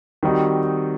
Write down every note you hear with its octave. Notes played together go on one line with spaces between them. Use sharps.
D#3 G3 C4 D#4 F#4